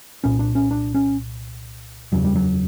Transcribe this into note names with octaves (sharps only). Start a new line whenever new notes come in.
C2 A#2 C#4
D4
C#4
D4
C#4
F#1 E2 C#3 F#3
G3
F#3